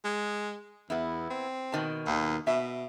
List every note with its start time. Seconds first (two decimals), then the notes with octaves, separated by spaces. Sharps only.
0.04 G#3
0.90 E2 B3 E4
1.30 C4
1.72 B2 D#3 A5
2.07 D#2
2.47 B2 E5